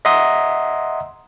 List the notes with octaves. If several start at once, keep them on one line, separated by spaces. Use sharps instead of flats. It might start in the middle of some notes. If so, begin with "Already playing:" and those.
D#5 E5 F#5 A#5 C6 D#6